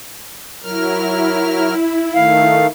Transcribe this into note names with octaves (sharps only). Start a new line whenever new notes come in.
F#3 E4 A#4 F6
D#3 A3 F5